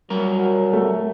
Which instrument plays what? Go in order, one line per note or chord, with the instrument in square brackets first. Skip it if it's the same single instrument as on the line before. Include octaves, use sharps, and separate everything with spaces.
[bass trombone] F#3 [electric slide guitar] G3 A#4
[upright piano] A3